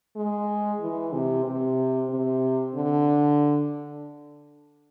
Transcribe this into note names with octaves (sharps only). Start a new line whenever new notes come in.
G#3
E3
C3
C3
C3
D3